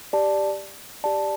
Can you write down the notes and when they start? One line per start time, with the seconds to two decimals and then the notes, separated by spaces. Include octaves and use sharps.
0.13 G4 D5 A5
1.04 G4 D5 A5